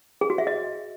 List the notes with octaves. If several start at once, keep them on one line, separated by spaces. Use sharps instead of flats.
G#4
F#4
E5
D#5